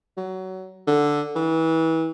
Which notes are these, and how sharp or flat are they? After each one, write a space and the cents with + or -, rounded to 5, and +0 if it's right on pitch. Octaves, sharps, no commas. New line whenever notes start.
F#3 +20
D3 +0
E3 -30